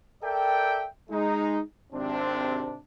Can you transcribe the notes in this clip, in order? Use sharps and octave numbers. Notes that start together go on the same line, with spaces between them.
A4 A#4 D5 E5 G5
G#3 D#4
G#1 C3 C4 D4